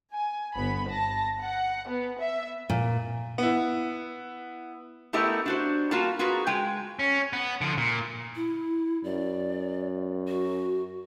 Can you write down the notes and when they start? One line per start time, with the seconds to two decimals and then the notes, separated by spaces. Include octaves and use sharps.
0.13 G#5
0.54 G1 B3 B5
0.88 A5 A#6
1.40 F#5
1.89 B3
2.20 E5
2.70 A#2
3.38 B3 E4
5.13 A3 B3 E4 G4 A#4 D#5
5.46 D4 F#4 C5
5.91 G3 A#3 F4 F#4 A#4 A5
6.19 F4 F#4 G#4 A#4 B4
6.47 G#3 G5 G#5
6.99 C#4
7.33 B3
7.61 D3 F3
7.78 A#2
8.36 E4
9.04 F#2 D5
10.28 F#4